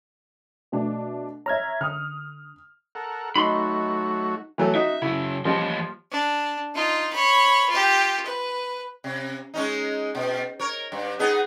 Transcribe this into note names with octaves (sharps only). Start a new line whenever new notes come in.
B2 A3 D4
C#5 E5 A#5 F6 G#6
D3 D#6 F6
A4 A#4 F#5
F#3 A3 D#4 F#4 B5 C6
E3 F#3 A3
D#4 F#4 E5
C#3 F#3 E4
E3 F3 G3 A#3 D#5
D4
D#4 F4
C#5 B5
F4 G4
B4
C3
G#3 C#4 D#4
B2
A#4 C#5
G2
B3 D#4 G#4